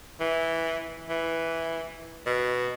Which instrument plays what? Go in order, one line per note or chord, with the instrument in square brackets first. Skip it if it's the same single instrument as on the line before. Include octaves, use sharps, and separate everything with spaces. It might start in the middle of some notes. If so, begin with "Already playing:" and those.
[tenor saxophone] E3
E3
B2